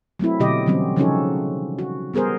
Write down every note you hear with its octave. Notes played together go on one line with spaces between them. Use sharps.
F#3 A3 C4 E4
B2 D3 F#3 G4 D#5
D3 E3 F#3 G3 C4 C#4
C#3 F3 C#4 D#4 F#4 A4
F#4
G3 B3 G#4 A#4 C5